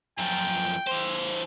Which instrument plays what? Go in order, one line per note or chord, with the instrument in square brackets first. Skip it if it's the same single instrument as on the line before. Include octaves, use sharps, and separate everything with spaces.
[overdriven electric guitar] F#2 F3 [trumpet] G5
[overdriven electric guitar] E3 C5